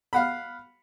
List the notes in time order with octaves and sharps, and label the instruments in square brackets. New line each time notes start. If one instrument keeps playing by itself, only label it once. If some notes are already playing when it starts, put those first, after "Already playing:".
[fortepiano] F5 F#5 B5